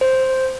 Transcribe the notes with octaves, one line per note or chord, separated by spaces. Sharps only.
C5